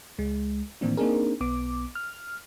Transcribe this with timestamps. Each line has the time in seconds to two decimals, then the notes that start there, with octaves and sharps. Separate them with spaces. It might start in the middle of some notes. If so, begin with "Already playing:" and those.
0.18 C#2 G#3
0.81 A2 D#3 E3 A#3 C4 D4
0.97 A#3 C4 D4 D#4 G#4 A#4
1.41 B1 B3 D6
1.95 F6